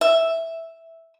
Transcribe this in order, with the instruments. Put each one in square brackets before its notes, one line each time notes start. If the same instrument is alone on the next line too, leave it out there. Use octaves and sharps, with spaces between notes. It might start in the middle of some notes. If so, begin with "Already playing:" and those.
[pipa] E5